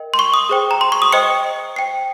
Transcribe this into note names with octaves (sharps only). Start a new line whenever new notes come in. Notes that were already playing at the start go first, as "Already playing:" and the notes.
Already playing: A#4 D#5 G5
C6
C#6
D#6
G#4 C5 G5
A#5
C6
C#6
D#6
C5 D#5 G5 C#7
C5 G5 C7